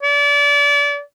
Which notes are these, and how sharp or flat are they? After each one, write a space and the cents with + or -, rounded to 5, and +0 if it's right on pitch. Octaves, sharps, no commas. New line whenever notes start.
D5 -30